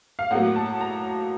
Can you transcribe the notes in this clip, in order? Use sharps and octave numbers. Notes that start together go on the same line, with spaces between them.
F5
A2 F#3 A#3 F#5
A5
A#5